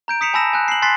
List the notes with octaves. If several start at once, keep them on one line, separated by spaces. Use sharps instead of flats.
A#5 G6 D7
D#6 B6 C#7 E7 F7
G#5 A5 B5 E6 A#6 E7
G#5 F#6
C7 F#7
G#5 C6 F#6 A6 B6 C7